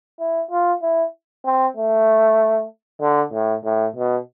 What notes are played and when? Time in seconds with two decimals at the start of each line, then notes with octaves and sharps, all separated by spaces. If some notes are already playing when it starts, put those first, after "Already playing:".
0.20 E4
0.51 F4
0.82 E4
1.45 C4
1.76 A3
3.01 D3
3.33 A2
3.65 A2
3.96 B2